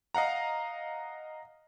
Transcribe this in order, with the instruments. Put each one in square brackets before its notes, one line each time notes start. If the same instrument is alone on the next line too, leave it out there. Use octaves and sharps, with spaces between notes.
[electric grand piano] D#5 F5 F#5 A#5